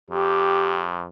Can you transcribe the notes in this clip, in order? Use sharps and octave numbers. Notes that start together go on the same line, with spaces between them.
F2 G4